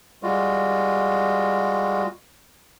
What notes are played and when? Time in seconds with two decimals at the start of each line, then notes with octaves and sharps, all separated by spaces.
0.23 G3 G#3 F4 F#4